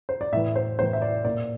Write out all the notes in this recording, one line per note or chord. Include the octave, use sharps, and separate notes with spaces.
C5
D5
A2 E3 E5
C5
A2 E3 C5
E5
D5
A#2 D5